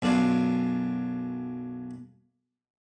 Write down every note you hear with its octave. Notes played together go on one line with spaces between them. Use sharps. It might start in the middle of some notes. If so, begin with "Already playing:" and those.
B1 F#2 D4 F4